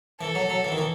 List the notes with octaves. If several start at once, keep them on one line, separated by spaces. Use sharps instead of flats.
E3 A4
F#3
F#3
E3
D#3
E3